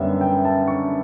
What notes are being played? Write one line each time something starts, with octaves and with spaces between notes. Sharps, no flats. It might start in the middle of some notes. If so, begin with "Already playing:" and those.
Already playing: F#2 D3 G3 B3 E5
G5
A5
C#6